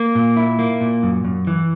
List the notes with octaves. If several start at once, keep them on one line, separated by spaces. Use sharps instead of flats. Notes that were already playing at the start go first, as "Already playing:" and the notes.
Already playing: A#3
A#2
E4
A#3
A#2
F#2
F#2
E3